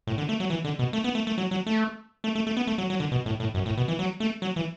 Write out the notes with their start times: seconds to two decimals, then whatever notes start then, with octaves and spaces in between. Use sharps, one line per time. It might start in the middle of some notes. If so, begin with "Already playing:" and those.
0.07 A2
0.18 D3
0.29 A3
0.40 F#3
0.50 E3
0.65 D3
0.79 B2
0.93 A3
1.04 B3
1.15 A3
1.27 A3
1.38 F#3
1.51 F#3
1.67 A3
2.24 A3
2.35 A3
2.47 A3
2.57 B3
2.67 A3
2.78 F#3
2.90 F#3
3.00 D3
3.12 B2
3.26 A2
3.40 A2
3.55 F#2
3.66 A2
3.77 B2
3.88 E3
3.99 F#3
4.20 A3
4.42 F#3
4.56 E3